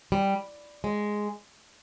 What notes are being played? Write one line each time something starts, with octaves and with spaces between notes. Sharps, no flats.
G3
G#3